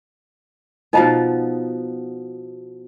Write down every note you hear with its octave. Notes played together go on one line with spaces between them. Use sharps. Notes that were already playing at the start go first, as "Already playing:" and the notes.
B2 F3 B3 D#4 D#5 A#5